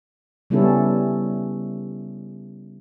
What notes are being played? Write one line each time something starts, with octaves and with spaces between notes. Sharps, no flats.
C#3 G3 B3 C#4 E4 A4